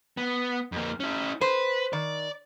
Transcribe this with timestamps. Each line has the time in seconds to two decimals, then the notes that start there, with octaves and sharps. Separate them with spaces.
0.17 B3
0.72 F2 A#3
1.00 C#4 E4
1.41 B4 C5
1.93 D#3 D5